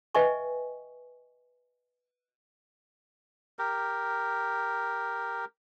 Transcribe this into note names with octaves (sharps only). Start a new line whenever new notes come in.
B4 D#5 E5 G5 G#5 C#6
G4 A#4